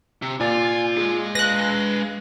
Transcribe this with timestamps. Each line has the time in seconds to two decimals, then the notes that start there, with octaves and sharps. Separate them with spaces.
0.22 C3
0.41 A#2 F4 D5 G#5 A6
0.98 G#3 G#4
1.35 B4 F5 F#6 A#6